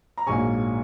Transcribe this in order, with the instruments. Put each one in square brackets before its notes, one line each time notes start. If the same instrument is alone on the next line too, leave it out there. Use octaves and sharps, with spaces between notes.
[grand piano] A#5
A#1 G#2 F#3 A#3 G#5 C#6